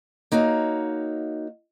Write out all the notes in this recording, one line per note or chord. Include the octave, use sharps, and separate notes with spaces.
A#3 D#4 F#4 C#5 F5